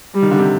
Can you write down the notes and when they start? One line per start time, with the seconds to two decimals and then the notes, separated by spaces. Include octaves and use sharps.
0.15 G3
0.22 D#3
0.31 D3
0.39 C3